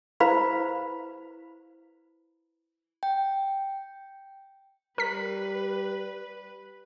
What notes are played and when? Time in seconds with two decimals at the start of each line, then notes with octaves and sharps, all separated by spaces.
0.20 E4 B4 C5 F5 A#5 B5
3.03 G5
4.98 G3 A#4 B4 B6